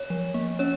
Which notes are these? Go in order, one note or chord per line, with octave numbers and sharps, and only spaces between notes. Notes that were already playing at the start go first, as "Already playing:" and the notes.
Already playing: C#5
F3
A#3
C#4 C#5